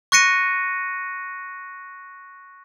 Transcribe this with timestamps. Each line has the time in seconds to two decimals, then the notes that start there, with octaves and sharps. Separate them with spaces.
0.12 C#6 F#6 A#6 C#7 D#7